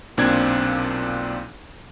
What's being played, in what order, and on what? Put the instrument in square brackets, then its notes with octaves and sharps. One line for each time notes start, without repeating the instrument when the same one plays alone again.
[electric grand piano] B1 A#2 C4 D4 G#6